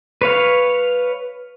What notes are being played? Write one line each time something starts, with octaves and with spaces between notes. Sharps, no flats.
B4 C#5 F5